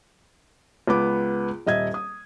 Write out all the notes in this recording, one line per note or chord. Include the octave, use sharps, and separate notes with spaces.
C#2 B3 D6
D#1 D#5 E5 G#6
D#6